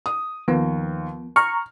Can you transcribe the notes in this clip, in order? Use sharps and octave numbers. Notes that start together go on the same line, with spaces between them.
D#6
D#2 F3 B3
A#5 C#6 F6